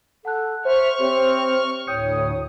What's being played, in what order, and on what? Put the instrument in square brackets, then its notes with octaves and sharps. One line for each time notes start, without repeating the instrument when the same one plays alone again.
[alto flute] A4 [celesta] F#5 A5 F#6
[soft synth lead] C5 [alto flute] E5 [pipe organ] C#6 F6
[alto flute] C4 [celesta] G4 C#5 E5
[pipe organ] D2 A2 [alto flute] C#5 [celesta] G5 G6 C#7 [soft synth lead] D#6